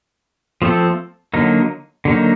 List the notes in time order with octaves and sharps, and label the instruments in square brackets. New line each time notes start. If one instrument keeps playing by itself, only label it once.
[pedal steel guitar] F3 A3 C4 F4 A4
D3 F#3 A#3 D#4
D3 F#3 A#3 D#4